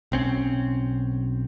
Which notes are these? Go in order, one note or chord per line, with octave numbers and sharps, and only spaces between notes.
B1 C4 C#4